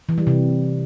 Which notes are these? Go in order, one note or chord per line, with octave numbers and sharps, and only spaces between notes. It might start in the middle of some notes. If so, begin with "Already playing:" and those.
E3
G3
C3